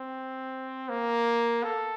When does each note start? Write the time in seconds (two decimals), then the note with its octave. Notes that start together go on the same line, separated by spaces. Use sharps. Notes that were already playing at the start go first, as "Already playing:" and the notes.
Already playing: C4
0.89 A#3
1.64 A4